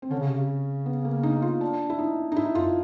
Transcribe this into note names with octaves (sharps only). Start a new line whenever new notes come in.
C4
D3 C#4
C#3
C3
C#3
B3
A#3
D#4
F4
D4
E4
D#4
D#4
G#2 E4
F#2 F4